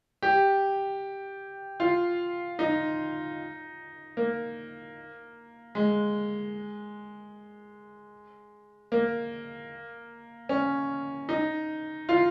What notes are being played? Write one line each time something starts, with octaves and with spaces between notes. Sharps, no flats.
G4
F4
D#4
A#3
G#3
A#3
C#4
D#4
F4